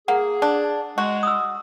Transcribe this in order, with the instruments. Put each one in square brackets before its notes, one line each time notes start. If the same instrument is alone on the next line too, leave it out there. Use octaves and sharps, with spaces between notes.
[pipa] A#3 [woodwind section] G#4 [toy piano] F#5
[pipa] D4
[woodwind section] G#3 [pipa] F#4
[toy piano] D#6 E6